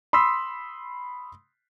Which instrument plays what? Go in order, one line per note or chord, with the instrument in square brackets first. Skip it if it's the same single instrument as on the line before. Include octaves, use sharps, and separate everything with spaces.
[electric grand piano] B5 C6 D#6 E6 B6